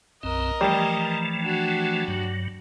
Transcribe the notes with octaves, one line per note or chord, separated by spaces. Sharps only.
B1 F#2 C4 A#4 D#5
E3 F3 G3 A3
D4 F#4
G2 F#3